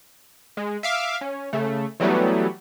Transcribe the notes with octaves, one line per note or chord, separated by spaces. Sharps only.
G#3
E5 F5 D6
C#4
C#3 A3
E3 F#3 G3 A3 B3